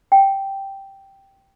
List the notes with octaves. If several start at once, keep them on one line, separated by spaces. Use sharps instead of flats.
G5